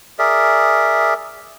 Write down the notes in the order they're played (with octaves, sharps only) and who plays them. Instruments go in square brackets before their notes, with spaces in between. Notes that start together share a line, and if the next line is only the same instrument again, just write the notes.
[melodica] G#4 A#4 D5 E5